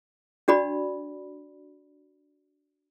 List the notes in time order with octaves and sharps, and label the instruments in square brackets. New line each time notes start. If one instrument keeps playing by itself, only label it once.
[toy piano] D4 F#4 D5 B5